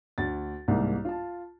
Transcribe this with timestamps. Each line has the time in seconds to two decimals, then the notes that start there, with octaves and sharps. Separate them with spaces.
0.18 D2 A6
0.68 C2 G#2 A#3
1.05 F4 A5